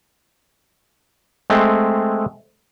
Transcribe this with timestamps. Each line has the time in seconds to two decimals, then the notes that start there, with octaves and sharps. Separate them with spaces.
1.50 G#3 A3 C4